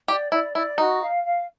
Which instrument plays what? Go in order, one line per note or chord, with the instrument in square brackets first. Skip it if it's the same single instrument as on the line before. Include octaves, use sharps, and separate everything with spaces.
[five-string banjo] G4 [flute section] D5
[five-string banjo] E4 [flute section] D5
[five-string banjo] E4 [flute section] D5
[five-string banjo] D#4 [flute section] F#4
[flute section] F5
F5